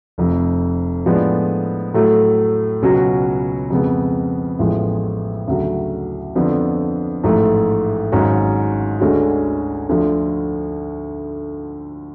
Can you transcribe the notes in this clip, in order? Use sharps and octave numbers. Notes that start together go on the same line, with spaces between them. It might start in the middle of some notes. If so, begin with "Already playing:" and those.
F1 F2 F3
A2 F3 G#3 B3 D4
A2 F#3 A3
C#2 B2 F#3 C#4 F#4
F2 C#3 G#3 B3
A1 A2 F3 G#3 B3
D2 C#3 F#3
F2 D3 F3 B3 D4
A1 G#2 F3 A3
G#1 G#2 F#3 C#4
D2 D3 G#3 C#4 F#4
D2 D3 F3